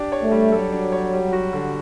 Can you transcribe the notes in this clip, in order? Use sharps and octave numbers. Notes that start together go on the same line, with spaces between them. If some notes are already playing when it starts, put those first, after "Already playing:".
Already playing: D4 G4
C#5
A3
G3
F#3 A4
D4
C#5
G3
F#4
D3